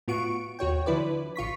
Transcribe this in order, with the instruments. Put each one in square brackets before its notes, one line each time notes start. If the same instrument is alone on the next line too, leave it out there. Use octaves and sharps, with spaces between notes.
[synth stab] A2 B3 F4 F#4 C#6 D7
D#2 F#4 C#5 G5
D3 F3 E4 B4 D5
A1 F4 C#6 B6